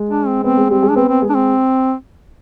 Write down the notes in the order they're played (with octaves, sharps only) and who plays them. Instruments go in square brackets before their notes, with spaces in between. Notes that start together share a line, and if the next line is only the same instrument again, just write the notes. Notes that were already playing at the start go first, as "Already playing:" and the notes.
Already playing: [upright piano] G#3
[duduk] D4
C4
[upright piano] B3 [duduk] C4
[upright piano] G#3 G#4
[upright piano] G3 G4 [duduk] C4
[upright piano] G#3 G#4
[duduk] D4
[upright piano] B3 B4 [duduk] C4
[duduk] C4
[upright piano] G#3 G#4
[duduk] D4
C4